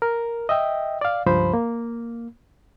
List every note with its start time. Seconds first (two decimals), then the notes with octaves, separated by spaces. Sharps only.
0.02 A#4
0.49 D#5 E5 G5
1.01 D5 F5
1.26 C#2 G2 F3 C5 B5
1.54 A#3